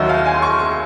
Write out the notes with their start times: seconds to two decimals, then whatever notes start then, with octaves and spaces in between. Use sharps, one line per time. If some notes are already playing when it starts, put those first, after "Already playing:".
Already playing: D#2 D#3 F#3 D#5 E5
0.09 F5
0.26 G#5
0.34 C6
0.42 C#6